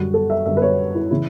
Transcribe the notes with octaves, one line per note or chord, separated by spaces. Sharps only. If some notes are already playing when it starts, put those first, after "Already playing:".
Already playing: F#2 D3 G3 F#4
A4
E5
F#2 D3 G3 E5
B4
C#5
E4
C#3 E3 E4